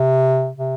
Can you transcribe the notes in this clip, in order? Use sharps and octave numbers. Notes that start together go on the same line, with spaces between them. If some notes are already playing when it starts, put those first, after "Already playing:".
Already playing: C3
C3